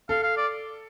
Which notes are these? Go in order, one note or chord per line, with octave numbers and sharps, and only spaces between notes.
A4 F5
F5
D5